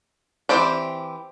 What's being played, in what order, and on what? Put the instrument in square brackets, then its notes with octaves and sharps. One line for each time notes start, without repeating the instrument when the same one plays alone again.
[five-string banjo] E3 C4 G4 D5